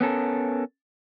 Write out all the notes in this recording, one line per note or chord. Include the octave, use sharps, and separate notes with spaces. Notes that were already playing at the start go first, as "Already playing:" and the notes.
B3 C#4 A4 A#4